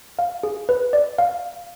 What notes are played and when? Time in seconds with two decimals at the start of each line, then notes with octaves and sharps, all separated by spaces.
0.19 F5
0.43 G#4
0.69 B4
0.93 D5
1.18 F5